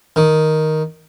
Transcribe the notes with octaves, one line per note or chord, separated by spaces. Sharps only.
D#3